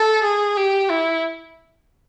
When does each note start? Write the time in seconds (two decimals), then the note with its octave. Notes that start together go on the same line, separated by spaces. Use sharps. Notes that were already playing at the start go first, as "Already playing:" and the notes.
Already playing: A4
0.24 G#4
0.57 G4
0.90 E4